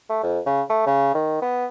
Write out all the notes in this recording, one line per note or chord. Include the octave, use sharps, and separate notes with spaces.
A3
F2
C#3
A3
C#3
D#3
B3